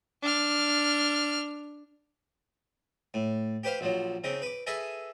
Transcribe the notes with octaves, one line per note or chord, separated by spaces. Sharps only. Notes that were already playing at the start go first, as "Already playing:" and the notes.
D4 F6
A2
G4 B4 C5 F5
A#1 F3 F#3
C#3 C4 D#4
B4 D6
G#4 A4 B4 D#5 E5